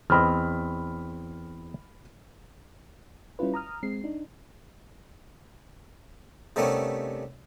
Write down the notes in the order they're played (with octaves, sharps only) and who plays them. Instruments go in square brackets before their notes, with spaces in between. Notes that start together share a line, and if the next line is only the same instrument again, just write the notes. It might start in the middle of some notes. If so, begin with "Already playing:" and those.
[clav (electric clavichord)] E2 C4 D#5 [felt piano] B5 F6
[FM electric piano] G3 C#4 E4 F4 B4
A#5 D#6 F6
G#3 C4 C7
D4 D#4
[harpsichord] C3 D#3 G3 A3 B3 C#4